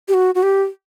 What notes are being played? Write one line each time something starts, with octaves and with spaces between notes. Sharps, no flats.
G4
F#4
F#4
G4